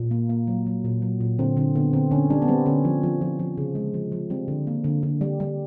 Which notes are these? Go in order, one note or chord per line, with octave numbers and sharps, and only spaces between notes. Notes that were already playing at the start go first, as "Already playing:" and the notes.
Already playing: A#2
A#3
A#3
F#3
F#3
A#2
F#3
A#2
D3 C4
D3 C4
D3 B3
D3 C4
D3 C#4
G3 D4
B3
G3 C4
D3 C#4
F3
F3
F3
F3
C#3
G#3
F3
F3
G3 C4
D3
A#3
D3
D3
G3
G3